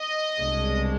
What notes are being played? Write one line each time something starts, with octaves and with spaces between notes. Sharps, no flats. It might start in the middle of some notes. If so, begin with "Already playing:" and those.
Already playing: D#5
C2 B2 G#3 D4